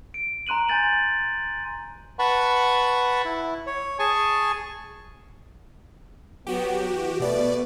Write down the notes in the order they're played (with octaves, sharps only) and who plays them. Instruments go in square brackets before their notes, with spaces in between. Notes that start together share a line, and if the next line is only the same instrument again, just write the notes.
[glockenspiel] D7
A#5 C6 F#6 D#7 F#7
G#5 G6 A6 F#7
[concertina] B4 F#5 A5 B5 C#6
E4
C#5
G#4 G#5 A5 C#6
[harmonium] F#3 B3 [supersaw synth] F#4 G4
[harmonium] E3
[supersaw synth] B2 D5 [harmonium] A3 B4